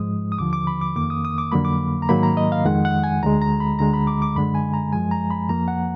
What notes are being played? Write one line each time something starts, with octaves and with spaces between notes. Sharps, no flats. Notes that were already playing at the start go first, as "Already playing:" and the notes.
Already playing: G#2 F3 G#3 D#6
D#6
D#2 D3 F3 D6
D6
B5
D6
F2 D#3 A#3 D6
D#6
D#6
D6
F2 D3 F#3 A#3 B5
D6
A#5
G#2 D#3 F#3 A#3 B5
A#5
D#5
F5
F2 D#3 G#3 F#5
F#5
G#5
D2 D3 G#3 A#5
A#5
B5
D2 D3 G#3 A#5
B5
D6
D6
F#2 D3 G#3 B5
G#5
A#5
F#2 F3 G#3 G#5
A#5
B5
F2 F3 A#3 A#5
F#5